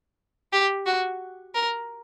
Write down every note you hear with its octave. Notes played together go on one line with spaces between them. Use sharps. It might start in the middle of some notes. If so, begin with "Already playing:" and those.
G4
F#4
A#4